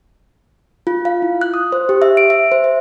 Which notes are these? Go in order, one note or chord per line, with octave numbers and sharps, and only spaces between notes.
F4
F5
E4
F#6
D#6
C5
G4
E5
D7
E5
C5
E5